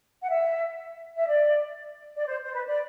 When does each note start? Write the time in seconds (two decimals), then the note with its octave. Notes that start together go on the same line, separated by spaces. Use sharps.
0.22 F#5
0.29 E5
1.17 E5
1.28 D5
2.17 D5
2.27 C5
2.44 C5
2.53 B4
2.66 D5